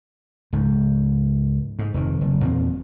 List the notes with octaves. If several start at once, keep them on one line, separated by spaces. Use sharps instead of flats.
C#2 G#2
G#2
F1 F2 D#3
F#1
E2 A#2 C4